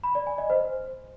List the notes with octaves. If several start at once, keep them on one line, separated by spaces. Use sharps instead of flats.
B5
D5
G#5
D#5
C5